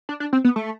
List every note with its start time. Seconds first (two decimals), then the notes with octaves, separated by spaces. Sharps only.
0.09 D4
0.20 D4
0.33 C4
0.45 B3
0.56 A3